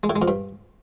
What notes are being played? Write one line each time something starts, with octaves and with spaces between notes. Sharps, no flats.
G#3
A2
G#3
F2
G2